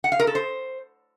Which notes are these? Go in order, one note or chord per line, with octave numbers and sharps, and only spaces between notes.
F#5
F5
A#4
A4
C5